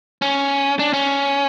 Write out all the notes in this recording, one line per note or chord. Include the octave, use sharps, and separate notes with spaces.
C#4
D4
C#4